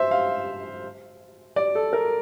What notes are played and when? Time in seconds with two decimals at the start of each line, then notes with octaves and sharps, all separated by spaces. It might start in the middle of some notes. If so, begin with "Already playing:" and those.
Already playing: C5 E5
0.11 F5
1.56 D5
1.75 A4
1.93 A#4